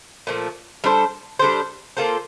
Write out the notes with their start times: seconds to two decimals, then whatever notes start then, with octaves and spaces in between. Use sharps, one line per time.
0.27 A#2 F3 A3
0.84 G3 D4 A4 C5
1.39 G3 D4 A4 C5
1.97 A#3 F4 A4 C5